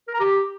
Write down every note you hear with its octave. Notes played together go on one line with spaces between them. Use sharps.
A#4
A#5
G4